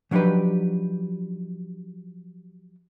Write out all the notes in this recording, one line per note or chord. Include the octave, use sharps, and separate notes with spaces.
F3 F#3 D4 D#4 G4 B4